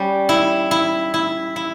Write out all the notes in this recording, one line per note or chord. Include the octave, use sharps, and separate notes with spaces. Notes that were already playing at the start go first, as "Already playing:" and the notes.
Already playing: G3 C#4
E4
E4
E4
E4